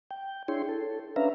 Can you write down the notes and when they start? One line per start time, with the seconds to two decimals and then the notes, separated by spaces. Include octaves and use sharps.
0.11 G5
0.48 D4 E4 G#4 C#5 G5 C6
0.69 A4
1.16 C#4 D4 B4 E5 F5 A#5